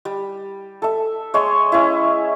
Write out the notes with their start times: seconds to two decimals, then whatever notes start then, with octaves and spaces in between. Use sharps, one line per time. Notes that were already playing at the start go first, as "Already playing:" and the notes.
0.05 G3
0.82 A4 E5
1.34 G#3 C#5 E5 C6
1.72 C#4 E4